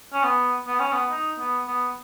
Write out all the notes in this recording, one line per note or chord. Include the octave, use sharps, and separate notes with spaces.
C#4
B3
B3
C#4
B3
D#4
B3
B3